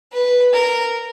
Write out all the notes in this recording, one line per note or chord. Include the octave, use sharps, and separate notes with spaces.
B4
A#4